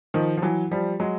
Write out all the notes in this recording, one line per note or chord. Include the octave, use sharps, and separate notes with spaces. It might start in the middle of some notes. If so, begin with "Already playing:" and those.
D#3 F3
F3
E3 F#3
F3 G3
F#3 G#3